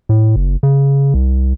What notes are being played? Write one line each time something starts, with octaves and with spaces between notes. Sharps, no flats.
A2
F#1
C#3
C2